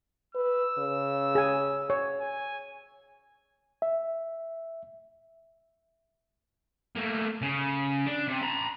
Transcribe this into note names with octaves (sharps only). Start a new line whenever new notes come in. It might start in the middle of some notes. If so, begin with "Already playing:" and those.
B4 E6
C#3
G#4 G#5
C#5
G#5
E5
A3 A#3
C#3
D4
C3
A#5 B5